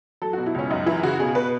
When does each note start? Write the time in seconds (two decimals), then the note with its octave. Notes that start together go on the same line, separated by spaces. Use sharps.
0.22 F#3 A4
0.33 F#4
0.37 B2
0.46 E4
0.54 C#2 C#4
0.70 F#2 D#4
0.86 E3 E4
1.03 C#3 F#4
1.20 B2 G#4
1.35 B2 B4